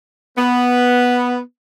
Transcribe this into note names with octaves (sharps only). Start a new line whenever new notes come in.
B3